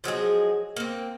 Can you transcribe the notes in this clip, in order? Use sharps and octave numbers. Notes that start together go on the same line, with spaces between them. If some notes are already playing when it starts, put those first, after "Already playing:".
F3 F#3 G#3 G#4
A#3 C4